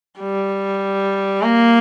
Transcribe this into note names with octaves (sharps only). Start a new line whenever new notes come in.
G3
A#3